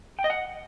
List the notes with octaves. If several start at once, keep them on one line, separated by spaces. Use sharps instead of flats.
G5
D#5
F#5